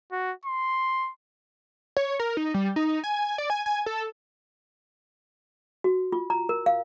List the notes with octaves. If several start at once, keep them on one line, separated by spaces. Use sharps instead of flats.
F#4
C6
C#5
A#4
D#4
G3
D#4
G#5
D5
G#5
G#5
A4
F#4
F4
A#5
A#4
F5